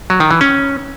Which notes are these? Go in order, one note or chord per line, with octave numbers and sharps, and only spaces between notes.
F#3
D#3
E3
C#4